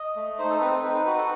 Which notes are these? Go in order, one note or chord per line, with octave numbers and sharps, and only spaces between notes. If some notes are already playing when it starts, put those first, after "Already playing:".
Already playing: D#5
A3
D#4 C5
A4
C4 B4
A4
D#4 B4
B4
F#4 B4
A4